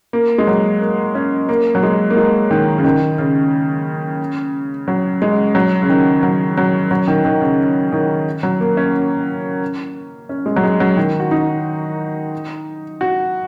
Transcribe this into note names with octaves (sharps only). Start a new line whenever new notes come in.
A#3
G#3
F#3
A#3
C#4
A#3
F#3
G#3
A#3
G#3
D#3
C#3
D#3
C#3
F#3
G#3
F#3
C#3
D#3
F#3
F#3
F#3
D#3
D#3
C#3
D#3
F#3
A#3
C#4
C#4
G#3
F#3
G#3
F#3
D#3
F#4
D#4
F#4